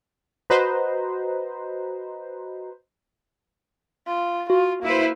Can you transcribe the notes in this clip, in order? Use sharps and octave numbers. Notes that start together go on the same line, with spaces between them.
F#4 B4 C5 D#5 A#5
F4
F4 F#4
A#3 E4 B4 C5